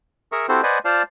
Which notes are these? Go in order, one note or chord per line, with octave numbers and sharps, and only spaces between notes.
G#4 A#4 E5 C#6
C4 E4 F#4 G4 A4 C5
B4 C5 D5 D#5 F#5 G#5
F4 C5 D5 F5 A5